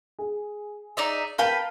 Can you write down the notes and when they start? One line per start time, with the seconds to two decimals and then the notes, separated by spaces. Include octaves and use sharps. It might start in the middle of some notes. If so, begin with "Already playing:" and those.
0.19 G#4
0.97 D#4 D5 E5
1.38 A#4 B4 F5 G5 A5 B5